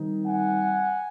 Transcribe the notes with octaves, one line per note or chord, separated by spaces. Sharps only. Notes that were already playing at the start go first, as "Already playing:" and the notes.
Already playing: D#3 G3 C4 D#4
F#5 G#5